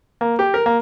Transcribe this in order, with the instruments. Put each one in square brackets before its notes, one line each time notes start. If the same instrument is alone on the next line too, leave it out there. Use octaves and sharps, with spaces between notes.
[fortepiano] A#3
G4
A#4
A#3